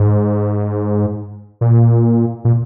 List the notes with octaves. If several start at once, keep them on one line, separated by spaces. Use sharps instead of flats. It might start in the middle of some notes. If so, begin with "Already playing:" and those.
Already playing: G#2
A#2
A#2